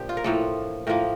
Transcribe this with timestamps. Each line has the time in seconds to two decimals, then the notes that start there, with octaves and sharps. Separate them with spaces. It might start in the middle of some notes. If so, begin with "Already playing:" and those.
Already playing: A#2 F3 D4 G4
0.09 F4
0.17 A#4
0.24 A2 F3 A#3 A4
0.87 A2 F3 A#3 A#4